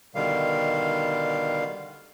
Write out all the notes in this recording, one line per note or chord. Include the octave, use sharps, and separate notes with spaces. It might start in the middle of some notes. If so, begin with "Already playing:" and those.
B2 D3 D#3 G3 F5